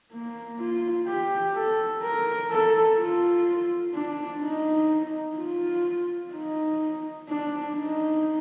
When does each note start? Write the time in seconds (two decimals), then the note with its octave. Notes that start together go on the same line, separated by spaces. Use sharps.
0.12 A#3
0.59 F4
1.07 G4
1.55 A4
2.02 A#4
2.51 A4
2.98 F4
3.94 D4
4.42 D#4
5.37 F4
6.33 D#4
7.29 D4
7.76 D#4